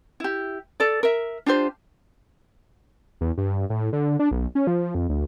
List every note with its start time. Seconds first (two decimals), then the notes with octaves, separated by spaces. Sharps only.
0.20 E4 G4
0.80 A4 D5
1.03 A#4 E5
1.46 D4 F4 G4 C5
3.21 E2
3.37 G2
3.70 A2
3.93 D3
4.19 D4
4.31 B1
4.55 C#4
4.67 F3
4.95 F2
5.09 D2